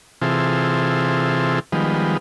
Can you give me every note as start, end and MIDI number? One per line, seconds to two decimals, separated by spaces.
0.22 1.59 48
0.22 1.59 52
0.22 1.59 60
0.22 1.59 65
0.22 1.59 68
0.22 1.59 69
1.72 2.17 51
1.72 2.17 53
1.72 2.17 55
1.72 2.17 56
1.72 2.17 59